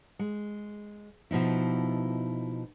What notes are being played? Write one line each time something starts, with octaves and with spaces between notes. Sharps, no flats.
G#3
B2 F3 D#4 E4